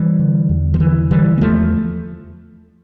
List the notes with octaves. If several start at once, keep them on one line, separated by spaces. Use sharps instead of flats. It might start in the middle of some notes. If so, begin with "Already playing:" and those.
Already playing: E3 G3
D3
E2
F3
D3 E3
D3 E3 G3
A#3
E2 F3 A3